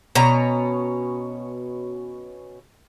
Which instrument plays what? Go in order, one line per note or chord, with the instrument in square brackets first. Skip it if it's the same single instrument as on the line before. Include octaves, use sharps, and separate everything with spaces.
[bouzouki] B2 C#4 A#5